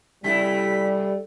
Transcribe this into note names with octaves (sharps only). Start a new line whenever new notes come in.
C3 G3 A3 E4 B6